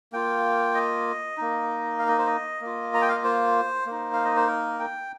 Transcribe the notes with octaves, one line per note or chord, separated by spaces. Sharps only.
A#3 F4 G5
D#5
A#3 D#4
F5
D#5
C5
D#5
A#3
F4
A#5
G5
F5
D#5
C5
A#3 D#4
F5
D#5
C5
A#4
G5